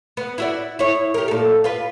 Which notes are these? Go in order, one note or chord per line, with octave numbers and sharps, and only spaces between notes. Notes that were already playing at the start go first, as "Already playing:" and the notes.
B3
E4 F#4 D5
E4 C#5
G4 A#4
A#2 A4
F4 B4